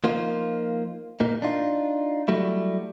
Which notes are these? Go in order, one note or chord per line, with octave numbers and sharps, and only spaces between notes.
F3 A#3 D#4 F4
A#2 A#3 D#4
D4 D#4 F4
F#3 G3 A3 E4